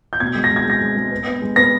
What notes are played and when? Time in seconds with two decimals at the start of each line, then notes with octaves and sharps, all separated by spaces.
0.13 G6
0.20 B2 G#6
0.35 G#3
0.44 A#6
0.50 G#3
0.56 G#6
0.65 G#3 A#6
0.81 G#3
0.97 G#3
1.11 B3
1.27 B3
1.42 G#3
1.56 B3 A#6